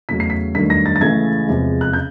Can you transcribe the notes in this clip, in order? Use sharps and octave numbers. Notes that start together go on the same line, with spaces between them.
E2 C#3 F#3 A3 B6
C7
B6
G2 D#3 F#3 A3 B6
A#6
A6
A6
C#2 C#3 E3 A3 G#6
E2 C3 F3 G#3
F#6
C#3 G6